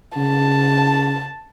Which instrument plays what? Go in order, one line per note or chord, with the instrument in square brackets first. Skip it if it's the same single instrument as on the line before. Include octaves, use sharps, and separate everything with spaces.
[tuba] C#3 [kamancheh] A5